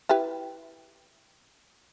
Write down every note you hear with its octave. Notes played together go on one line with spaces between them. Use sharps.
E4 G4 B4